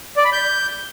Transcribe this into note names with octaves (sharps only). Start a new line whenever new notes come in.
D5
B5
G6